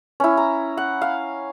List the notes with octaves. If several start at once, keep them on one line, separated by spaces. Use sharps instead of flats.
C#4 E4
A#5
F#5
F5